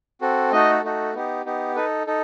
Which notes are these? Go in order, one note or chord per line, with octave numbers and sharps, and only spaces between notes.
C4 F#4 A4
A3 D#4 F#4 A4 D#5
A3 D#4 F#4 A4
B3 D#4 G4
B3 D#4 G4
D#4 A4 B4
D#4 A4